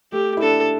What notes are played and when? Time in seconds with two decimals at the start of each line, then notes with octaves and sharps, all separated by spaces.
0.12 A3 G4
0.37 E4
0.42 D4 A4